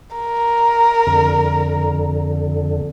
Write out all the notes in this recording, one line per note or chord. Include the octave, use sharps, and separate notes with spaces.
A#4
F2 D3